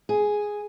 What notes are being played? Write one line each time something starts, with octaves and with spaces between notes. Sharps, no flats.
G#4